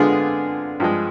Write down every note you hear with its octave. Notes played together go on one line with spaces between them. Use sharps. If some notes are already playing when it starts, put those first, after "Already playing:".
Already playing: D3 G#3 B3 C4 D4 F4 G#4
G2 F3 G#3